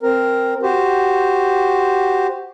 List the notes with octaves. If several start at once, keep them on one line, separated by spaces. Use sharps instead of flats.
C4 A#4
F#4 G4 C5